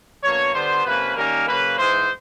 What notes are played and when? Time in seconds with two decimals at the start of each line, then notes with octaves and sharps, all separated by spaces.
0.24 B2 F#3 A#3 D4 C#5
0.54 D3 G3 B3 D4 C5
0.86 C3 F3 A#3 C#4 B4
1.16 D#3 G3 A#3 C#4 A#4
1.47 C#3 F#3 A#3 B4
1.78 G#2 E3 G#3 C5